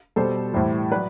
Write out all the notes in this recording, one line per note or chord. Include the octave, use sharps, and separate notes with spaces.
B2 G3 A4 C5
A2 E3 G3 C5 E5
F#3 B4 D5